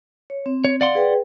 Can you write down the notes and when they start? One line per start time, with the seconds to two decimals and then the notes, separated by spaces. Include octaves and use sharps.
0.30 C#5
0.46 C4
0.65 C#5
0.81 D5 F5 F#5 C6
0.95 G#4 B4 G5